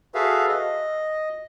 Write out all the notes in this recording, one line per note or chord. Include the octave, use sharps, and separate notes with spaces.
F#4 G#4 A4 B4 E5 F5
D#5